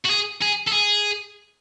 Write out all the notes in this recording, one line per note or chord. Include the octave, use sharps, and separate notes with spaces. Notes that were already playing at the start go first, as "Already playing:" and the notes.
F#4
G#4
G#4
A4
G#4